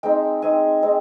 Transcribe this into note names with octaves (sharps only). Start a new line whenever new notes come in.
G#3 C4 D#4 G5
G#3 C4 D#4 G#5
G#3 C4 D#4